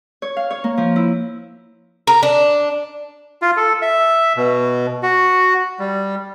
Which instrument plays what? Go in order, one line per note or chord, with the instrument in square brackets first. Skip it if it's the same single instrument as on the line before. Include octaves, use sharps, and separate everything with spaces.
[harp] C#5
F5
C#5
A#3
F3
E4
[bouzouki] A#4
D4
[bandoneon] F4
A4
E5
B2
F#4
G3